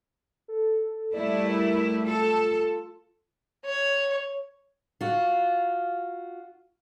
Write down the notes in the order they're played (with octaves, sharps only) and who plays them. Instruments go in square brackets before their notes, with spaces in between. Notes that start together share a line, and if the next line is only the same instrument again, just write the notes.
[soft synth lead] A4
[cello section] G3 A3 E4 [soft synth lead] D5
[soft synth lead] A#4
[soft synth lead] F4 [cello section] A4
[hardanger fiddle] C#5
[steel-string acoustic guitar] F4 F#4